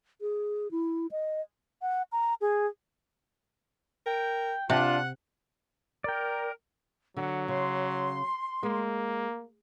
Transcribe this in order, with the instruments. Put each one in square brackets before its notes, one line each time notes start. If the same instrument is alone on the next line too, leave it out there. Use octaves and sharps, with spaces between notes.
[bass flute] G#4
E4
D#5
[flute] F#5
A#5
G#4
[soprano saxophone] A#4 [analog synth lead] G5
[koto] C3 [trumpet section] D4 F4 [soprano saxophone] F#5 [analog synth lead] F#6
[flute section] A#4 [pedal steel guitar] D5 G5
[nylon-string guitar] D3 [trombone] F#3 [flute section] F#5
[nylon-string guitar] C#3 [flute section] C6
[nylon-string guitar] G#3 [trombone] A#3